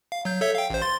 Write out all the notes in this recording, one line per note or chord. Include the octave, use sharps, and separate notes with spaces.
F5
F#3 G6
A4 C#5 E5
F5 G5
A1 C5
C6 A6